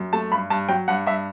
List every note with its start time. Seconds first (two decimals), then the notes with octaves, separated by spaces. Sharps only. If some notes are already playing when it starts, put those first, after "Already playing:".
Already playing: F#2
0.13 A3 A5
0.32 G2 B5
0.50 G2 A5
0.69 F#3 G5
0.88 G2 F#5
1.06 G2 E5